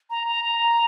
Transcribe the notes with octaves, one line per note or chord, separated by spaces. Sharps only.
A#5
A#5
A#5